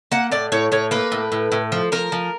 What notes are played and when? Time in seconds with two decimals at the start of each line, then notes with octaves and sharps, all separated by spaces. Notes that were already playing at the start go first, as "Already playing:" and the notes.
0.12 A#3 F#5
0.32 A2 D5
0.52 A2 C#5
0.72 A2 C#5
0.91 A#3 B4
1.12 A2
1.32 A2
1.52 A2
1.72 F3
1.92 F3 A#4
2.12 F3